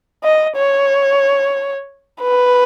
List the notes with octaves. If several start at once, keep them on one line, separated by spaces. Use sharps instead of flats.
D#5
C#5
B4